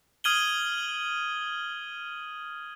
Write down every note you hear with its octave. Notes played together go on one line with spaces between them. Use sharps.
D#6 F6 G#6 D#7 F#7 G7